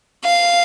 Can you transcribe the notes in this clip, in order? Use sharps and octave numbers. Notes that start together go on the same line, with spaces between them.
F5